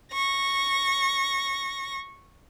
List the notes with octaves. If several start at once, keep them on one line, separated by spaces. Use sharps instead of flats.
C#6 A#6